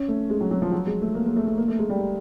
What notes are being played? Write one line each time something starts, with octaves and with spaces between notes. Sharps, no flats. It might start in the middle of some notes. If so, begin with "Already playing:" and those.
Already playing: C#4
A3
G#3
F#3
F#3
F3
F#3
G#3
A3
A#3
A#3
A3
A3
A#3
A3
G#3
G3